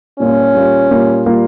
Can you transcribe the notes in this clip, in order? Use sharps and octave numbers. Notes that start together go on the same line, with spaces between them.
A#2 G3 A#3 C#4 F4
A#2 G3 A#3 F4
A#2 G3 A#3 F4
A#2 G3 A#3 F4